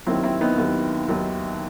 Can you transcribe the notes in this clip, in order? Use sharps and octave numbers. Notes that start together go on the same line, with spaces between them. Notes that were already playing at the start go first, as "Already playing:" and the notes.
D#2 D#3 F#3 C4 E4
C4 E4
B3 D#4
D#2 D#3 F#3
D#2 D#3 F#3